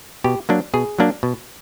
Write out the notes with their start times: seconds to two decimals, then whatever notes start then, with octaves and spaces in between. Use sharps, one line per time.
0.24 B2 G4
0.49 F#3 A#3 D4
0.74 B2 G#4
0.99 F#3 A#3 D4
1.23 B2